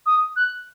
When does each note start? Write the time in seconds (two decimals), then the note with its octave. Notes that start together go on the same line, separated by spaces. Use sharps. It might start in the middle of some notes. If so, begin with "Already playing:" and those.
0.06 D#6
0.36 F#6